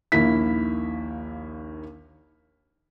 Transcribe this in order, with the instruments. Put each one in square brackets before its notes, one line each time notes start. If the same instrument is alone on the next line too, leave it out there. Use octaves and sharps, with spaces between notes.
[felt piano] A#1 D#2 A#3 E4 B6